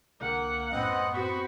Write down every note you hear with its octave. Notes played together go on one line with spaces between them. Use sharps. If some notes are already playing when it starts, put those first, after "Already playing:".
C2 D3 A#3 F#5 G5
F#2 A2 B3 C4 D#5 F#6
C4 F#4 B5 C#6